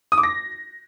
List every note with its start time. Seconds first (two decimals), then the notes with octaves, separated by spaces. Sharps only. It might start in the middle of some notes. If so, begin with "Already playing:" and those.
0.12 D#6
0.18 D6
0.23 A#6